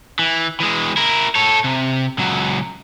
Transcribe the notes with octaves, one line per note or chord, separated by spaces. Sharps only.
E3
E3 G#3
E4 A#4
A4 C#5
C3
C#2 F#3